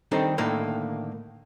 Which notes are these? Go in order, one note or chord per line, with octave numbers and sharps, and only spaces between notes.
D#3 G3 C4 D4 D#4 A4
A2 D3 D#3 A3 A#3